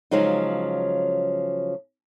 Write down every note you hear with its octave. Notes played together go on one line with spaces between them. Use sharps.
C#3 F3 F#3 G#3 D#4